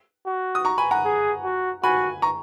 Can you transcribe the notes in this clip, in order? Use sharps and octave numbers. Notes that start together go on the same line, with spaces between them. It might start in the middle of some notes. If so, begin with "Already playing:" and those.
F#4
D#6
A#5 C#6
G#5 B5
F#5 A#5
G#4
F#4
F#4 G#5 B5
A#5 C#6